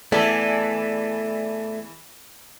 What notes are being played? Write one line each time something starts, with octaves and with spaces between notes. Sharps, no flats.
E2 E3 A3 G#4 A4 D5 E5 A5